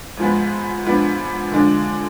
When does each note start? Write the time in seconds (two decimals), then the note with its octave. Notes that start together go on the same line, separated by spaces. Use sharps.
0.17 G#2 F3 G#3 B3
0.85 G#2 F3 B3 D4
1.52 D3 F3 G#3 D4